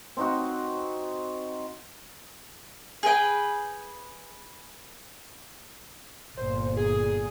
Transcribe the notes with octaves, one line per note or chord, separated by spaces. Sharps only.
C4 D#4 F#4
G#4 B4 G5
G1 A#2 C5
G#4